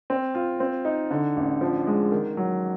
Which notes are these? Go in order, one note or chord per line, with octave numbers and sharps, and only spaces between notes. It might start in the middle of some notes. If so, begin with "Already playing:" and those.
C4
F4
C4
D#4
D3
A1
F3
G#3
D#3
F#3